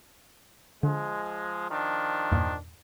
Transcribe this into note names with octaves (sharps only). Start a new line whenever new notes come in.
D3 F3 G#3
D#3 F3 D4
E2 G2 A#2